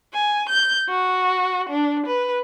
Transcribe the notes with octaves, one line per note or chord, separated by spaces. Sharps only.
G#5
G6
F#4
D4
B4